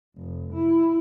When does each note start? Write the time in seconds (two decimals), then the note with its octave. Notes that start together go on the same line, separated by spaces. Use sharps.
0.17 F1
0.53 E4